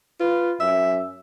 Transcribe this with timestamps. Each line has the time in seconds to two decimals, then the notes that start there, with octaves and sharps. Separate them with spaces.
0.20 F4 B4
0.60 F#2 E5